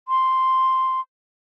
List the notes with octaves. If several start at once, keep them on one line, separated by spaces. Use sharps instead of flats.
C6